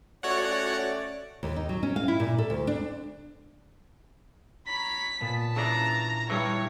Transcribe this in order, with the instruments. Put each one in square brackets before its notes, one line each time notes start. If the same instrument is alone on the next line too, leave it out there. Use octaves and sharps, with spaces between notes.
[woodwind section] A3 C#4 D5 [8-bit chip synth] F#4 C#5 F#5
[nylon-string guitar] D#2
D#4
F#3
C#4
F5
E4
A#2
A4
D2
D4
[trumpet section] C#5 A#5 B5 [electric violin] B6
[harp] A#2 B3 [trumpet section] A5
[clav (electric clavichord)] C#3 E3 D4 [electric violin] A#5
[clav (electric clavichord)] G2 E3 [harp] G3 A#6 [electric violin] C#5